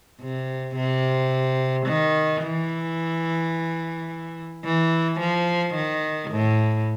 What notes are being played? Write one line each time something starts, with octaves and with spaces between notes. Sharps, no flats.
C3
C3
D#3
E3
E3
F3
D#3
A2